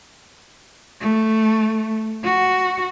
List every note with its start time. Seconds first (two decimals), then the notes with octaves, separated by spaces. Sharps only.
1.01 A3
2.24 F#4